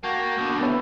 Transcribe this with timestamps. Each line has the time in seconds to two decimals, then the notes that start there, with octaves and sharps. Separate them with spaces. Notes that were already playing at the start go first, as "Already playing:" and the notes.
0.03 A#3 F#4 G5 A5
0.38 B2 D3
0.61 B3 E4 A4 C#5